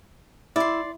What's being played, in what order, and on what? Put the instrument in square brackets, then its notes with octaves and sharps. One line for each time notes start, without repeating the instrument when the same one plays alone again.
[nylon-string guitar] E4 [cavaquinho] D5 C6